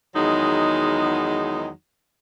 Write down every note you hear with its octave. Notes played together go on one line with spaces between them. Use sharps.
E2 D#3 F#3 G#3 D#4